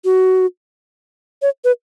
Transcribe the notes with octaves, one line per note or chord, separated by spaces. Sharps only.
F#4
C#5
B4